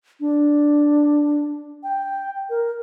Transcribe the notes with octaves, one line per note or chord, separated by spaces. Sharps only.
D4
G5
A#4